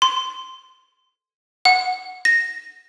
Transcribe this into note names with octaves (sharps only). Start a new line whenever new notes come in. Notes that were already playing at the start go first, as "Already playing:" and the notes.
C6
F#5
A#6